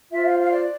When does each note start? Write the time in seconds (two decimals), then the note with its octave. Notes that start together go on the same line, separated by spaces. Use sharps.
0.10 F4 C5 E5
0.25 F5
0.38 F5
0.51 D5